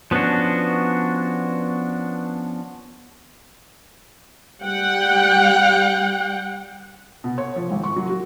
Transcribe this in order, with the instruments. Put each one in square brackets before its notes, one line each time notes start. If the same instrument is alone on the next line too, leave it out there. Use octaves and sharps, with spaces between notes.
[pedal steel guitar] F3 B3 C#4 D4 F#4
[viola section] G3 F#5 G5
[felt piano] B2
C#5
F3
G#1
C#6
F#3
F#4